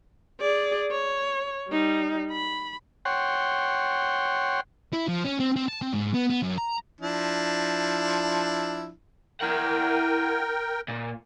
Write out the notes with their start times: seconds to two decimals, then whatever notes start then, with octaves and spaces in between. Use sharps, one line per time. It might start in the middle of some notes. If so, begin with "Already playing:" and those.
0.40 G#4 D5
0.91 C#5
1.69 G3 D#4
2.31 B5
3.05 C#5 F#5 G5 C6
4.93 E4
5.08 F3
5.25 C#4
5.40 C4
5.56 C4
5.68 A5
5.82 C4
5.93 G#2
6.14 B3
6.30 B3
6.42 F#2
6.58 A#5
7.01 F3 D4 E4
9.40 E4 A#4 F#5 G5
10.88 A#2